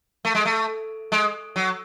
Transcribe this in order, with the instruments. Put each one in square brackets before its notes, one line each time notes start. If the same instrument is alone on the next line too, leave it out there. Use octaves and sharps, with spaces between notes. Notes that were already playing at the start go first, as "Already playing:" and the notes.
[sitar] A3
G#3
A3
G#3
F#3